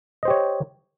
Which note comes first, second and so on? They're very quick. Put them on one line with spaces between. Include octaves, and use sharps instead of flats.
D#5 C5 G4 C#5